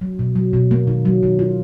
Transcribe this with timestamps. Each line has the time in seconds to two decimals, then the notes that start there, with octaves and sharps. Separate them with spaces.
0.01 F#3
0.19 B2
0.36 F#3
0.53 B2
0.71 A#3
0.87 D#3
1.05 F#3
1.23 D#3
1.39 F4